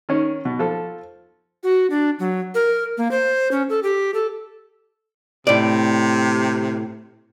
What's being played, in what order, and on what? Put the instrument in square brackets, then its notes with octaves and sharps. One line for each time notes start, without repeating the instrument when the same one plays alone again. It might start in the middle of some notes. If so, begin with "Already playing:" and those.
[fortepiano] D#3 C#4
B2
F3 A4
[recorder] F#4
D4
F#3
A#4
A#3
C5
C#4
A4
G4
A4
[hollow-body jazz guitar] A2 D5 [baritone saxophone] C3